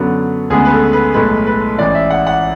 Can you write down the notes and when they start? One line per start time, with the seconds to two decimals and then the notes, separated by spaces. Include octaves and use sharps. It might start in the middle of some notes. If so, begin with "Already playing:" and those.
Already playing: F#2 D3 F#3 B3
0.50 D2 C#3 G#3 B3 G#4
0.65 B4
0.71 A4
0.93 B4
1.14 B1 A2 G#3 B4
1.47 B4
1.78 A1 G#2 E3 D5
1.95 E5
2.10 F#5
2.27 F#5